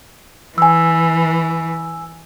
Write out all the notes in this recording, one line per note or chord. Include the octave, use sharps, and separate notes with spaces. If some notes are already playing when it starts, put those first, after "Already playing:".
E3 G#5 E6